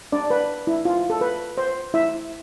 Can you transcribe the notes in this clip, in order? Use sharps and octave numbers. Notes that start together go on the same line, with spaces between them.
D4 D5
B4
E4
F4
A4
B4
C5
E4 E5